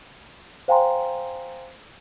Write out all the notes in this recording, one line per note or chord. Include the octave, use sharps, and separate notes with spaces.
C5 F5 G5 G#5 A#5 C6